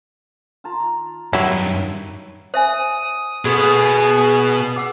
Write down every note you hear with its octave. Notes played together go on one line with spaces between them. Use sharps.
F4 A5 A#5
F#2 D#3 F#3 G3 E4
C5 E5 G#5 D#6
B2 B3 F#4 G#4 A4
G#4 F#5 E6